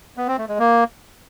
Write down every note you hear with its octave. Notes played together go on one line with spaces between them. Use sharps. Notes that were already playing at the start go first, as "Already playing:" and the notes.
B3
C4
A3
G#3
A#3